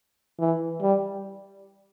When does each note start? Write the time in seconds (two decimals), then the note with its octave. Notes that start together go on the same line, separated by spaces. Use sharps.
0.40 E3
0.82 G3